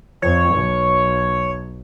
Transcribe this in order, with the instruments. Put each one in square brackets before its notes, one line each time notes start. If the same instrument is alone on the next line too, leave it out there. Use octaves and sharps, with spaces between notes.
[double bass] F2 [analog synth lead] C#5
[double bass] B1